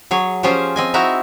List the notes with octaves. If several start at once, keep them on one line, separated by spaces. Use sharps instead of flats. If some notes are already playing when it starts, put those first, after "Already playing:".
F#3 G#4 C#5
F3 C#4 F4 G4 G#4 C5
C4 D#5 G#5
D#4 E4 F#4 E5 A#5